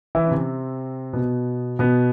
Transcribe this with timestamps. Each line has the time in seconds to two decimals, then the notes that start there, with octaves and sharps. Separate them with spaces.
0.15 E3 E4
0.24 C#4
0.31 C3 C4
1.13 B2 B3
1.79 B2 B3